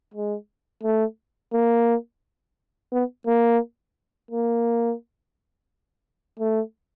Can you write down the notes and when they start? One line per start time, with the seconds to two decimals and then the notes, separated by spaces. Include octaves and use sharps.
0.14 G#3
0.83 A3
1.53 A#3
2.93 B3
3.27 A#3
4.31 A#3
6.39 A3